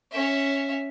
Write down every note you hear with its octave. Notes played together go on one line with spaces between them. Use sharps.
C#4 E5